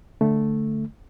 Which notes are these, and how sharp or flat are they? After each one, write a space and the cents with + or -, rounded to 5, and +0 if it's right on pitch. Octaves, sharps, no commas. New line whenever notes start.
D3 +0 A3 +0